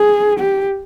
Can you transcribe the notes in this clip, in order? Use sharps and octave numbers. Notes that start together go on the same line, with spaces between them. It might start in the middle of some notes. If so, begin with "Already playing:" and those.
Already playing: G#4
G4